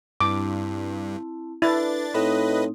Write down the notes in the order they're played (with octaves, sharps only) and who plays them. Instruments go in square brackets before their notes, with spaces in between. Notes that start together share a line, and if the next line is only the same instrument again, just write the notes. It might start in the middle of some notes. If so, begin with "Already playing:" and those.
[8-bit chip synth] G2 [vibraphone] C4 E4 A5 [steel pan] D6
[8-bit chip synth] D4 A6 [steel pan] E4 [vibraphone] A4 B4
[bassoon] A2 [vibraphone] A3 C4 D#4 [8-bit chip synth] B4 D#5